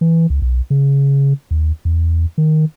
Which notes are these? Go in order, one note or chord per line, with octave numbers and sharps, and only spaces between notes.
E3
C#2
B1
C#3
D#2
E2
D#3